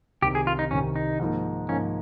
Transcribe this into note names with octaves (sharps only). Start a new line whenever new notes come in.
C2 C3 D#3 G4
G#4
F4
D#4
C2 C3 D#3 C#4
D#4
G#2 F3 A#3 D#4
G#2 F3 A#3 C#4 D#4